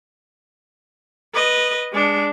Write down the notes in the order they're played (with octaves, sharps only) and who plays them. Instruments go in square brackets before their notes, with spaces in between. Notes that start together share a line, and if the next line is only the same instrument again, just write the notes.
[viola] B4 D#5
G#3 D4